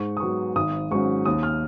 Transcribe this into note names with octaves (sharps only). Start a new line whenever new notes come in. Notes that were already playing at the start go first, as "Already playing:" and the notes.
Already playing: G#2 C#6
D#6
F#3 B3 C#6
G#1 D#6
G#2 F#3 C#4 C#6
D#2 D#6
F6